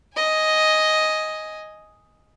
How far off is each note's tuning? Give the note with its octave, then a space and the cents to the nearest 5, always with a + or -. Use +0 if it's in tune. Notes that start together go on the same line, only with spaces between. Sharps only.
D#5 +5 G#5 +0